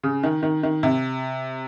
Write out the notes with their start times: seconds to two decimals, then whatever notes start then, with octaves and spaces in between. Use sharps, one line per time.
0.03 C#3
0.23 D#3
0.43 D#3
0.63 D#3
0.83 C3